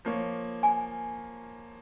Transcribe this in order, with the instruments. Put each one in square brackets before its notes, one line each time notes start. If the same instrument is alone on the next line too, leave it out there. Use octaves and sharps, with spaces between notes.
[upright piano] F3 A#3 C#5
[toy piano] G#5